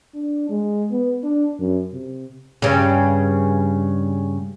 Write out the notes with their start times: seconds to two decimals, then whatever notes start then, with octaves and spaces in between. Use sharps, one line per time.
0.14 D4
0.50 G#3
0.91 B3
1.23 D4
1.59 F#2
1.93 C3
2.62 G2 C#3